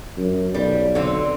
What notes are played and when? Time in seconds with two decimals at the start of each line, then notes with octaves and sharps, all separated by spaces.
0.17 F#2
0.54 B1 G3
0.95 D3 C4